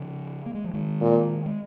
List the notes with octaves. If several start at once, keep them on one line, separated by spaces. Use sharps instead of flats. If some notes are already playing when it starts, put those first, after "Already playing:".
Already playing: C#3 F3
A#3
G#3
F3
D#3 G#3
A#2
G#3